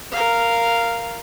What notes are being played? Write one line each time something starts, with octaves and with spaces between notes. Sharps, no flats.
A#4 F5